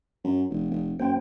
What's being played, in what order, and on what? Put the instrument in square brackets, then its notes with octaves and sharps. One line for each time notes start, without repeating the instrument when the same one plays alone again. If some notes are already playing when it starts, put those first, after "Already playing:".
[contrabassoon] F#2
F1
F1
[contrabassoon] F#2 [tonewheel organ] A#3 C5 G5